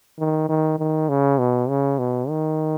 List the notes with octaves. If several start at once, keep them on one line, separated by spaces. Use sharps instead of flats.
D#3
D#3
D#3
C#3
B2
C#3
B2
D#3